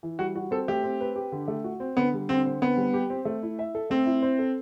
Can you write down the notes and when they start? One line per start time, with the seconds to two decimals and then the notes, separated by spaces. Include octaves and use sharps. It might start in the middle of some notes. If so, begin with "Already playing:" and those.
0.03 E3
0.19 G3 F#4
0.36 F#4
0.51 C4 A4
0.68 A3 G4
0.84 C4
1.01 B4
1.16 G4
1.32 D3
1.48 A3
1.64 F#4
1.80 C4
1.97 D3 B3
2.14 G3
2.29 D3 C4
2.46 C4
2.62 D3 B3
2.77 G3
2.94 G4
3.10 C4
3.25 A3
3.43 E4
3.59 E5
3.75 A4
3.90 A3 C4
4.06 E4
4.22 C5
4.39 A4